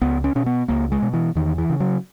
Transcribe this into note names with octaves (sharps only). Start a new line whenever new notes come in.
C#2 B3
C#4
B2 C#4
B3
C#2 A#3
G#3
B2
E3
E2 D#3
E3
C#3
F#3